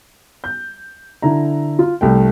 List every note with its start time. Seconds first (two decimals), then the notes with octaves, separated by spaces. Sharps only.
0.44 G6
1.22 D3 E4 A#5
1.79 F4
2.01 C2 A3 G5